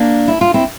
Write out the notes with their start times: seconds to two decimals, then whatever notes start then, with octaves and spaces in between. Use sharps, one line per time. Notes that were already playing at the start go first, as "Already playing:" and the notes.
Already playing: A#3 D4
0.28 E4
0.41 F4
0.54 C4 E4